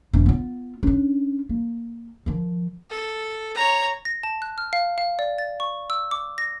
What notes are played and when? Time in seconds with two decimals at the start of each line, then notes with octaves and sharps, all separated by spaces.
0.13 E1
0.26 B3 F4
0.83 C#4 D4
1.49 A#3
2.26 D#3 F3
2.90 A4
3.55 C#5 A#5
4.05 A#6
4.23 A5
4.42 F#6
4.58 F6
4.73 F5
4.98 F5
5.19 D5
5.38 A6
5.60 C#6
5.90 E6
6.11 D6
6.38 A#6